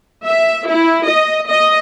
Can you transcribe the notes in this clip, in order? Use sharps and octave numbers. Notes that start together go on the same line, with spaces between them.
E5
E4
D#5
D#5